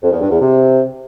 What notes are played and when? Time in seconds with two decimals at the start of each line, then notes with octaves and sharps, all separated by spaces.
0.03 F2
0.12 E2
0.21 G2
0.30 E2
0.40 C3